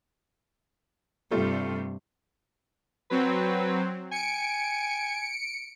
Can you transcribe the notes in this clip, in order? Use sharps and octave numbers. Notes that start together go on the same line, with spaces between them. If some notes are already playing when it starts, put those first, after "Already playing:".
G2 C3 G3 A3 F4
F#3 C4 B4
G#5 C#7 D7